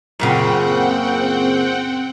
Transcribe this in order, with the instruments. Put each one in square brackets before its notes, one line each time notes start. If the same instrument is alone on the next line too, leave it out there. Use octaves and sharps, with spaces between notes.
[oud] F#2 A#2 C#3 [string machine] C4 F#5 G5